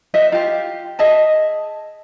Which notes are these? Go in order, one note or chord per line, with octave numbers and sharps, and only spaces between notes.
F#4 C5 D#5 E5
F4 G4
G#4 D#5 E5 A5